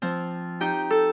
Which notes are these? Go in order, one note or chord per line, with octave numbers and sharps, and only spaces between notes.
F3 C4
D#4 G4 G5
A4